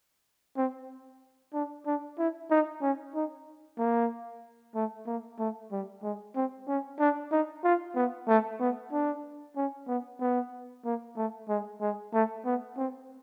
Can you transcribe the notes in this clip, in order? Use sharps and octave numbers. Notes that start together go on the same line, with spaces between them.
C4
D4
D4
E4
D#4
C#4
D#4
A#3
A3
A#3
A3
G3
G#3
C4
C#4
D4
D#4
F4
B3
A3
B3
D4
C#4
B3
B3
A#3
A3
G#3
G#3
A3
B3
C4